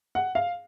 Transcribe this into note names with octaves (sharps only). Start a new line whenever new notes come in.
F#5
F5